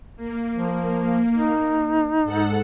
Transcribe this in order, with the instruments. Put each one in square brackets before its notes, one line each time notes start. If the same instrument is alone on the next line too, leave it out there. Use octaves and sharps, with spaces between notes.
[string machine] A#3
[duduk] F3
D#4
[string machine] G#2 A4 F#5